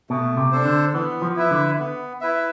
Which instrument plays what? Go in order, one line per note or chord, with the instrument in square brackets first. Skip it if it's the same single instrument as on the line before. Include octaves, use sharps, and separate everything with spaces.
[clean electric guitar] B2 [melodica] A3
[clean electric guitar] C3
[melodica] D4 A4 C5
[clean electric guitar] D3
[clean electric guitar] E3 [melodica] B3
[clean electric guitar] F3
[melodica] E4 B4 E5
[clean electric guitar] D3
[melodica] B3
E4 B4 E5